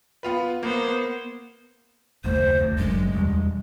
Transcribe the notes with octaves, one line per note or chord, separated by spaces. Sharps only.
B3 F4 B4
A#3 B3 C5
F#1 D#2 A3 C5
D2
G1 F#2 G#3
E1 G3